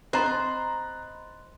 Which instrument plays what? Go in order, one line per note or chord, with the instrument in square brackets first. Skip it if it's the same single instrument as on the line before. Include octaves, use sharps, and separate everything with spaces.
[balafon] C4 [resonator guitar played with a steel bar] C5 [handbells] D#5 B5 A6 [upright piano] A#5 F#6